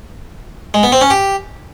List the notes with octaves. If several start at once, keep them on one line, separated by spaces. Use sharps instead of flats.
G#3
B3
C4
C#4
G4